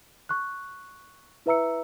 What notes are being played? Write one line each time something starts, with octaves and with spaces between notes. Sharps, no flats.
C#6 F#6
E4 B4 E5 A#5 E6 C#7